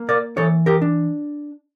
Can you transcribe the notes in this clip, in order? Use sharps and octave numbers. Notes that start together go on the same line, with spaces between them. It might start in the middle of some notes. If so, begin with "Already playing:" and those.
Already playing: A#3
A#4 D5
E3 A4 C#5
G4 A#4
D4